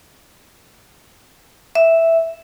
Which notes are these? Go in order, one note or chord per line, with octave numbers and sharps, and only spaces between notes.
E5